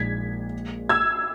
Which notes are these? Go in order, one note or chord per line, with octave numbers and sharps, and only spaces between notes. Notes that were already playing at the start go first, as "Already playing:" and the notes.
Already playing: A#1 A#2 G#3 D#4 G#6 B6
E6 G#6